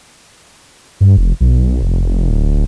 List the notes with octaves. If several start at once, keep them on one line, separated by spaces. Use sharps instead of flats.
G2
F1
B1
F1
D1